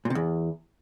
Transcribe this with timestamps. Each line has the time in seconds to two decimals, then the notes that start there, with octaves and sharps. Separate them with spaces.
0.05 A#2
0.10 C3
0.15 E2